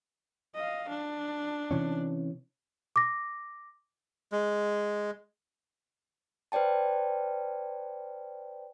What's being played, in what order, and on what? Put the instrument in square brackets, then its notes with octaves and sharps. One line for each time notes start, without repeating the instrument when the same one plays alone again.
[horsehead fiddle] D#5 F5
D4
[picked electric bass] C3 E3 C#4
[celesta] D6 A#6
[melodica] G#3
[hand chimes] B4 C5 D5 G5 A5